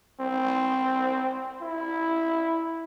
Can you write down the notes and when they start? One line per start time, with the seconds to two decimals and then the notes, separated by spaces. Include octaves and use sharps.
0.20 C4
1.62 E4